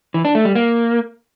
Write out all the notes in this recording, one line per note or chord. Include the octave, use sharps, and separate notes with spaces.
E3
D4
A3
G3
A#3